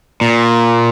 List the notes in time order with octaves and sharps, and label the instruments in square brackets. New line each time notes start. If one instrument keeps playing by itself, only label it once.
[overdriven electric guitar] A#2